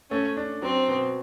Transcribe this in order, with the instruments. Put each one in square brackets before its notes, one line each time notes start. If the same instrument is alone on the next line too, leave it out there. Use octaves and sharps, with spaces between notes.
[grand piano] A3 [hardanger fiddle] C#4
[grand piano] D4
[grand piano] F#3 [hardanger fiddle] C4
[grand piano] B2